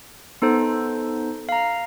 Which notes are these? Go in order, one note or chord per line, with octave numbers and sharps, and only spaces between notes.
B3 D#4 A4 C5
F5 A#5